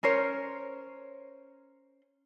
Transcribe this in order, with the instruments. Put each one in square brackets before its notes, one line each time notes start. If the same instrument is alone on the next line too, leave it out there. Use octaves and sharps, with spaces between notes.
[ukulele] C#4 A#4 C5 C#5